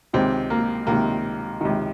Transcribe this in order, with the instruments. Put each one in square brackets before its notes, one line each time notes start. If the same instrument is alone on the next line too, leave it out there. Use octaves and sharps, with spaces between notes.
[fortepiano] C#2 C3 D#3 C4
A#3
C#2 C3 D#3 A#3
C#2 C3 D#3